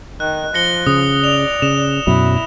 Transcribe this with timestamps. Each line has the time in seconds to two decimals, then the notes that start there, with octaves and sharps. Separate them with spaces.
0.20 D#3 F#6
0.54 F3 A#6 C#7 G7
0.87 C#3 D#6
1.24 D5 F7
1.62 C#3 E7
2.07 F#2 B2 F#3 E4